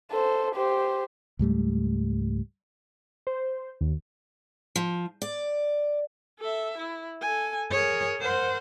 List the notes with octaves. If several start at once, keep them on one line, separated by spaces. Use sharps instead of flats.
A4 C5
G4 C5
C#2 G#2 G3 A3
C5
D#2
F3
D5
A4 E5
E4
A4 G#5
G#4 A#4 C#5
A#4 C5 F#5